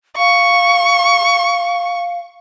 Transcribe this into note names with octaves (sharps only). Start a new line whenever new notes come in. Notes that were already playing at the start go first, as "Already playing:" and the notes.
F5 C#6